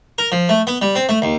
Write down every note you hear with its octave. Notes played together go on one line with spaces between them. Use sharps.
A#4
F3
A3
B3
G3
C4
A3
D#2